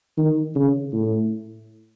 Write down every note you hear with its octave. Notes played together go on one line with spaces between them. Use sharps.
D#3
C#3
A2